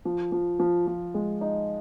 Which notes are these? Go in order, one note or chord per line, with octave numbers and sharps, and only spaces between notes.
F3
F3
F3
F3
G#3
D#4